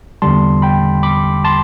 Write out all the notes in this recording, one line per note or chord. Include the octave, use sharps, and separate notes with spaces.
E2 D3 G3 A5 C6
G5 B5
B5 D6
A5 C6